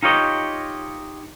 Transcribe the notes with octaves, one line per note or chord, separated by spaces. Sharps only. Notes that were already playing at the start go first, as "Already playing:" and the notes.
D#4 F4 G4 C#5 D#5